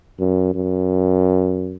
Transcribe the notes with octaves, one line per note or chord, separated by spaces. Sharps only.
F#2
F#2